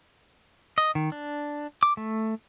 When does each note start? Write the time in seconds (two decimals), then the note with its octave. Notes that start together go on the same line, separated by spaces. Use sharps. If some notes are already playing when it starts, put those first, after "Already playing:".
0.78 D#5
0.95 D#3
1.12 D4
1.83 D6
1.97 A3